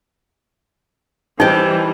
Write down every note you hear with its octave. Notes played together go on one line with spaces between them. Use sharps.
E3 G3 D#4 G4 C5 D#5